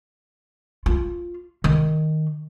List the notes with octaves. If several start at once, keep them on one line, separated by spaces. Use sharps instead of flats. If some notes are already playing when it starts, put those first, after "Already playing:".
F4
D#3